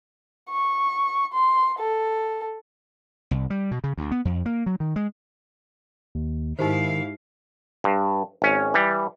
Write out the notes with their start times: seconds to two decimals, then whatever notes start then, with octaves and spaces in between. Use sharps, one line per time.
0.50 C#6
1.33 C6
1.79 A4
3.31 C2
3.50 G3
3.71 B2
3.84 C#3
3.97 D2
4.11 B3
4.25 F2
4.46 A#3
4.66 F#3
4.80 D#3
4.96 G#3
6.15 D#2
6.59 G#2 D#3 D#4 E4 G4 C5 F5
7.84 G2
8.42 G#1 C#4
8.74 E3 G3